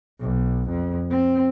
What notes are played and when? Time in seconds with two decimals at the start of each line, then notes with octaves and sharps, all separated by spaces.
0.21 B1
0.69 F2
1.10 C4